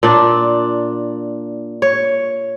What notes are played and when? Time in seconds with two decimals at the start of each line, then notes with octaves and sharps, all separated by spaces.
0.03 A#2 D4
1.82 C#5